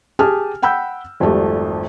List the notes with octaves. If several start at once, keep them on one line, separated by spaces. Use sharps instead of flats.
G4 G#4 G#5 A5 F6
F#5 G5 B5 E6 G6
G#1 F2 G3 A3